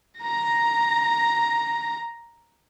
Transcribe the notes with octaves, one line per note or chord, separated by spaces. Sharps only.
A#5 A#6